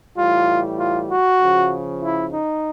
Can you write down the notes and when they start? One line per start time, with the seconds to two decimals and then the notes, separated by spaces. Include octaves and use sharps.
0.17 A2 E3 G3 F4
0.78 F4
1.09 F#4
1.40 C#3 F3
2.02 E4
2.32 D#4